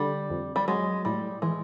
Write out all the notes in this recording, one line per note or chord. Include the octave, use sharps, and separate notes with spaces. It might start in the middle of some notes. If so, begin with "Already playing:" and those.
Already playing: D3 G3
F2
G3
F#3 G#3
A2 G3
E3 G#3